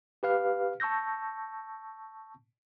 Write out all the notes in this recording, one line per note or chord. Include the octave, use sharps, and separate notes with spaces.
G4 B4 F5 F6
A5 C#6 E6 G6 A#6